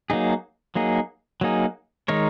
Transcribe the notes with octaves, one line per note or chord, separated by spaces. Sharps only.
F#3 A#3 D#4 G#4
F#3 A#3 D#4 G#4
F#3 A#3 D#4 G#4
D#3 G#3 D#4 A#4 C#5